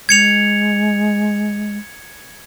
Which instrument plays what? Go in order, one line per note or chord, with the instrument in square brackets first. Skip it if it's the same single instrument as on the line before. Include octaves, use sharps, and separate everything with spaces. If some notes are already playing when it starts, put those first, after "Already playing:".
[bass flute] G#3 [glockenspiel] G#6 C#7 F7